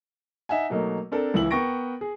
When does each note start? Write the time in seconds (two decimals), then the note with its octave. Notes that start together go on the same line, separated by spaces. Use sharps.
0.49 D#4 E5 F#5 G#5
0.70 B2 F#3 A3 A#3 D#4
1.12 C4 D4 A4 A#4
1.34 C#2 E3 E4 F#7
1.51 B3 A#4 G5 C#6 A#6 D7
2.01 G#4